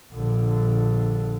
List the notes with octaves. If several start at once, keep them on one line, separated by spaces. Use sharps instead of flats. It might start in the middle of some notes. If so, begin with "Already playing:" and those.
A#1 D3